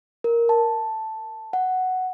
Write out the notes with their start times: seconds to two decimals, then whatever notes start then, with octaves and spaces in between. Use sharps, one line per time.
0.24 A#4
0.49 A5
1.53 F#5